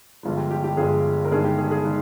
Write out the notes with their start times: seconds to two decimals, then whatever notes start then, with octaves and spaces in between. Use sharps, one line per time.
0.23 G1 G2 F3 G#3
0.37 G4
0.51 G4
0.64 G4
0.77 G1 G2 F3 G#3 G#4
1.25 A#4
1.31 G1 G2 D#3 G#3 G#4
1.44 G4
1.58 G#4
1.71 G#4
1.85 D#3 G#3